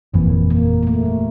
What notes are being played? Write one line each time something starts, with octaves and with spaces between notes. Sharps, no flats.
G1 F2 A#2 E3 A#3
A#2 A#3
A#3
A3
G3